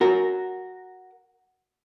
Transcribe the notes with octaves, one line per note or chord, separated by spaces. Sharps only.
F#4 A#4